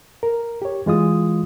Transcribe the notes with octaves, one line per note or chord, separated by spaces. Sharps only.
A#4
G4 C#5
E3 G#3 F4 D#6